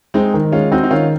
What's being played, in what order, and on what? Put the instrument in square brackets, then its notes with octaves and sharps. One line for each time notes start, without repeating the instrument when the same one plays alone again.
[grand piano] G#3 [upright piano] C4 D#4
[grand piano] D#3
[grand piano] G#3 [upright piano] C#4 F4
[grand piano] C4 [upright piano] D#4 F#4
[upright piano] D#4
[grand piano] D#3 [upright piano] C#4 F4